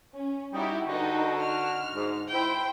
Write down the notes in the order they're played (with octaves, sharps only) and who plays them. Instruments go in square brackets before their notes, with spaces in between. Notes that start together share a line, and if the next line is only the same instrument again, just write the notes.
[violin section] C#4
[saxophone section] G3 D#4 [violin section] E4 F#4 G4
[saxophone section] D3 F#4 [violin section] D#4 A4 B4
[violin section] F6
[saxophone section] G#2
[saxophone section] E4 [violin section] C5 G5